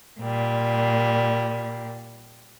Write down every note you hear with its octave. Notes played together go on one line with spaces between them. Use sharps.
A#2 G3